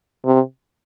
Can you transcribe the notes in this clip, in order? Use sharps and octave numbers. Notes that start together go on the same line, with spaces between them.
C3